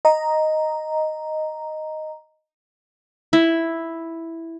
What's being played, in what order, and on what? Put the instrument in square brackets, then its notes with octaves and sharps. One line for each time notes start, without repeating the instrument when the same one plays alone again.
[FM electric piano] D#5 A#5
[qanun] E4